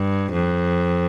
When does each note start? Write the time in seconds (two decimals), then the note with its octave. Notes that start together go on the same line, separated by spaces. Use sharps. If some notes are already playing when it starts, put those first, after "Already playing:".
Already playing: G2
0.33 F2